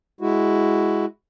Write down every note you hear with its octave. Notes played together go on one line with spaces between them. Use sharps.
G#3 E4 F#4